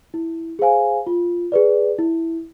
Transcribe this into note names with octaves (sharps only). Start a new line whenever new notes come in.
E4
G#4 C5 F5 G#5
F4
G#4 B4 D5
E4